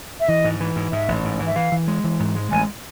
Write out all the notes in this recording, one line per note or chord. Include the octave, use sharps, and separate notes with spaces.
E5
E3 D#5
G#2
E3
G#2
G#2 E5
A1
G#2
E3
E5
E3 F5
E3
G#3
E3
G#2
G#3
A1 G#5